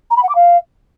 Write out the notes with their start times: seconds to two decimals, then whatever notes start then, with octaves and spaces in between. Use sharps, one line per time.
0.10 A#5
0.16 B5
0.23 F#5
0.29 D6
0.35 F5